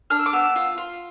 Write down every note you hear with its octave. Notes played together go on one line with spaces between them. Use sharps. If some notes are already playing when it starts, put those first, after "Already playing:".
D4 F6
E6
D6
B3 E6
F4
F4